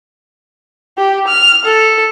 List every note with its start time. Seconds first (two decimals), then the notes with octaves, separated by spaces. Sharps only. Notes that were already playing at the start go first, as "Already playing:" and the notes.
0.98 G4
1.28 F6
1.65 A4